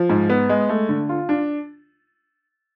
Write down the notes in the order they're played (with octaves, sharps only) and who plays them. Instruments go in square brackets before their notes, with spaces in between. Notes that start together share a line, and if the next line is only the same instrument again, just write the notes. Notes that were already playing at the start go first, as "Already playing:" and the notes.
Already playing: [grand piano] F3
G#2
B3
G#3
A3
D3
F4
D4